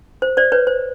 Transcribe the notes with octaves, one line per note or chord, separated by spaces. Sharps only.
C5
C5 D5
B4 C#5
C5